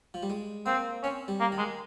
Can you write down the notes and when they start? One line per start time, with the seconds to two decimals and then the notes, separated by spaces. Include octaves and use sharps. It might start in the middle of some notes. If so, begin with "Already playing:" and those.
0.14 F3
0.23 G3
0.30 G#3
0.66 A#3 C4
1.03 C4 C#4
1.28 G3
1.40 A#3
1.52 D#3
1.58 G#3